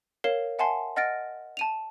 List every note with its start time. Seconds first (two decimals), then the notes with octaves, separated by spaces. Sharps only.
0.24 A#4 C#5 F5 C7 E7 G7
0.59 E5 F#5 G#5 A5 C6 C7
0.96 D#5 F#5 F6 A6 A#6 D7
1.57 A5 D#7 F7